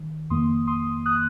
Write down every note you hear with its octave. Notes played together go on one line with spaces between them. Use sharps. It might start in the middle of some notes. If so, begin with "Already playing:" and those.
Already playing: D#3
F2 D#3 A#3 C6 D#6
C6 D#6
D#6 F#6